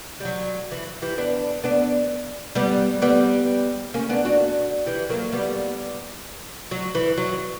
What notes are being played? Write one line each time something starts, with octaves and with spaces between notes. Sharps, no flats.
G3
F#3
E3
E3 G3
B3 D4
B3 D4
G3 B3
G3 B3
A#3 C#4
B3 D4
D4 F#4
E3 G3
F#3 A#3
G3 B3
F#3
E3
F#3